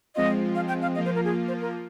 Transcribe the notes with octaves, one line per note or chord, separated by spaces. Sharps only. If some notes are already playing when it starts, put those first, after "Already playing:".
F3 G#3 C4 F4 D#5
F5
G5
F5
F3 A#3 F4 D#5
C5
A#4
G#4
C5
A#4